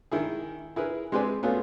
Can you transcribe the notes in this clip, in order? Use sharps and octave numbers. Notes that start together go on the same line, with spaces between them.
D#3 E4 G#4
E4 G#4 A#4 B4
G#3 C4 G4 B4 D5 G#5
A3 B3 C#4 F4 F#4 G#4